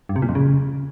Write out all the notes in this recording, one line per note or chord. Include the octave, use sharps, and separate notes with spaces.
G2
C3
A#2
F2
C#3